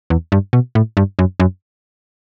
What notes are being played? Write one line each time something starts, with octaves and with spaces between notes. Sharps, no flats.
E2
G2
B2
A2
G2
F#2
F#2